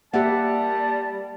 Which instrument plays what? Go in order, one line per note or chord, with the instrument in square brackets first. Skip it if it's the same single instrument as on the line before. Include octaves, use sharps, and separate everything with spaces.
[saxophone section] G3 [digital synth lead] A#3 [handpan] G4 E5 F#5 [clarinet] A5